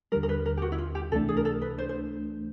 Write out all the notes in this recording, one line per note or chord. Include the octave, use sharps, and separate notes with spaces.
D#2 D3 G3 A#4
A#4
B4
A#4
G4
F#4
E4
F4
G4
C#2 C3 E3 A3 D4 A4
G#4
A#4
A4
B4
C5
C5